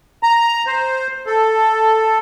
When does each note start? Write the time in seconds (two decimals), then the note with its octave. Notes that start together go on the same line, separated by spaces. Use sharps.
0.23 A#5
0.67 C5
1.26 A4